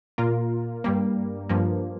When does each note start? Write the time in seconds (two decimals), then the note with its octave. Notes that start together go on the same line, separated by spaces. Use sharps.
0.18 A#2 A#3 F4 A#4
0.84 G2 G3 A#3
1.49 G2 F3 A#3